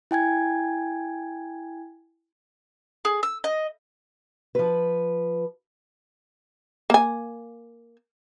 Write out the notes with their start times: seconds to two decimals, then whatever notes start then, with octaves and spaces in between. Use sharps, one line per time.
0.11 E4 G5 G#5 G#6
3.05 G#4
3.23 E6
3.44 D#5
4.55 F3 B4
6.90 A#3 G#5